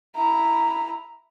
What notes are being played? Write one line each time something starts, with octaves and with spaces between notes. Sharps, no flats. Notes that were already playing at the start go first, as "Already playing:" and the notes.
E4 A#5